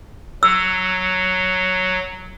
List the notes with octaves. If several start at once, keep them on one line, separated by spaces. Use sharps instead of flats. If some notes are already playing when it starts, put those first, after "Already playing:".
F#3 E6